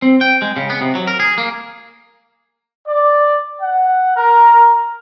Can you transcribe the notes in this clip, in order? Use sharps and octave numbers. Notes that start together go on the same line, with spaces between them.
C4
G5
G#3
C#3
B3
C3
F#3
A#4
G#4
A#3
D5
F#5
A#4